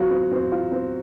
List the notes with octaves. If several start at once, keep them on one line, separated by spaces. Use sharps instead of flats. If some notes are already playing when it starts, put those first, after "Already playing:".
Already playing: F#3 C4 F4 F#4
C4
C4
F4
C4